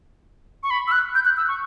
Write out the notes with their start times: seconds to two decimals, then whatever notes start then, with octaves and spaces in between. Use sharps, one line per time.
0.63 C#6
0.71 B5
0.88 E6
0.92 F#6
1.15 G6
1.25 F#6
1.37 E6
1.48 C#6